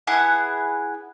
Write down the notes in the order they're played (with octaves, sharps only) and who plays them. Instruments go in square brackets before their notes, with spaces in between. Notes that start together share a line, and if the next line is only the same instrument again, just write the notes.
[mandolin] B3 E4 G#4 F#5